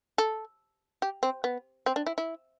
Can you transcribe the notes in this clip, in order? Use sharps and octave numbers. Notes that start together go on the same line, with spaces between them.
A4
G4
C4
B3
C4
D4
E4
E4